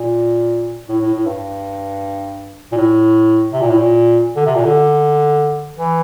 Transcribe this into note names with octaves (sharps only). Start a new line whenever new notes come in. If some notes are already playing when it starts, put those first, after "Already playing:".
Already playing: A#2
A2
A2
A2
G2
A#2
A2
C3
A#2
A2
A#2
D3
C3
A#2
D3
E3